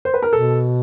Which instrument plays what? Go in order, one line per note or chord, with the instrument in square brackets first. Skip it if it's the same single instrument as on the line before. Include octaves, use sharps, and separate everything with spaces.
[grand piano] C5
B4
A#4
[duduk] B2 [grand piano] A4